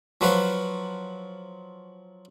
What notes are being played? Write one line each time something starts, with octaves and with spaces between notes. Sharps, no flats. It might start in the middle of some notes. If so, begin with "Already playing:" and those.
F3 F#3 B4 F5